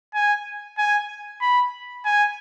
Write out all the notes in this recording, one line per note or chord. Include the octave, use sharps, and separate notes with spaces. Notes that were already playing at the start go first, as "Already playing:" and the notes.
G#5
G#5
B5
G#5